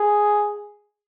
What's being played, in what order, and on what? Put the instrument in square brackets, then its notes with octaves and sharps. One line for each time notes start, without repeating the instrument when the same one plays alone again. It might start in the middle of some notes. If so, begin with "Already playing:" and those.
Already playing: [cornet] G#4